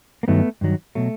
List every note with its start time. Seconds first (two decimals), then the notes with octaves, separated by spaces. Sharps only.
0.23 A#3
0.28 G2 D#3 F#3 A3 B3
0.61 G2 D#3 F#3
0.95 B2 F#3 A3